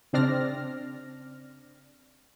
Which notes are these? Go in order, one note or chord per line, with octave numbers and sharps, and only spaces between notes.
C#3 C4 D4 D5 F6 A#6